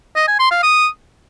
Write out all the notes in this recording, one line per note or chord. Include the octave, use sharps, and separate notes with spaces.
D#5
G#5
C6
F5
D#6